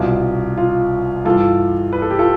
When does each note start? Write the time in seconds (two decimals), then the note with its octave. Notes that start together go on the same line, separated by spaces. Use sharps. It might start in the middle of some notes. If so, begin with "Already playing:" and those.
Already playing: C2 B2 F4
0.58 F4
1.25 G2 E3 F4 A4
1.93 B4
2.02 A4
2.10 G4
2.19 F4 A4